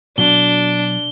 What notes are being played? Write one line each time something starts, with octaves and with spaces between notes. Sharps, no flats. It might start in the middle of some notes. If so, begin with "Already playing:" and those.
B2 F#3 D4 G7